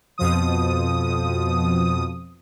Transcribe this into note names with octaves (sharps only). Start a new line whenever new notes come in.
F2 B2 F3 D#6